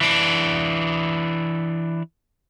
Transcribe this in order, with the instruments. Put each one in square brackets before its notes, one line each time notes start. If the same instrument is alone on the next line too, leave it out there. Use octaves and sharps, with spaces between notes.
[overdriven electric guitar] E3 D4